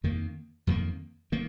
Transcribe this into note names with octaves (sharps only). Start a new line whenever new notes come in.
F2 D#3 A#3
F2 D#3 A#3
D#3 A#3